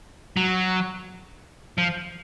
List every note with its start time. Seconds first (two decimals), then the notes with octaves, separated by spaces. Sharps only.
0.37 F#3
1.78 F3